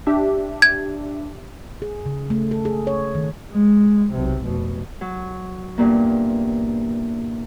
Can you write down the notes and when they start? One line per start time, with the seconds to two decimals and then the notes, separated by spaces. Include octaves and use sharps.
0.07 D4 G4 E5
0.62 G#6
1.82 G#4
2.06 C#3
2.30 A3
2.51 A4
2.65 G#4
2.87 C#5
3.15 D#3
3.52 G#3
4.13 B1 C3
4.43 F1 B2
5.01 F#3
5.78 E2 G2 A#2 A#3